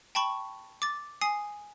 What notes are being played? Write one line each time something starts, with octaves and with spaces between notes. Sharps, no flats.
G5 A5 B5 C#6
D6 A6
G#5 D#6 C7